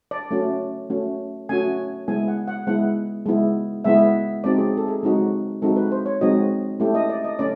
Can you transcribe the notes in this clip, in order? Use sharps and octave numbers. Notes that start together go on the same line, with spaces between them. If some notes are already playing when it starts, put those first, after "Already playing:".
D5
A3 C#4 F#4
A3 C#4 F#4
A3 C#4 F#4 G#5
G#3 B3 E4 G#5
F#5
F#5
G#3 B3 E4 F#5
G#3 B3 E4
G#3 B3 E4 E5
G#3 C4 D#4 F#4 D5
G#4
A4
G#4
G#3 C4 D#4 F#4
G#3 C4 D#4 F#4 A4
B4
C5
C#5
G#3 C4 D#4 F#4 D#5
A3 C#4 E4 G4
D#5
D5
D#5
A3 C#4 D5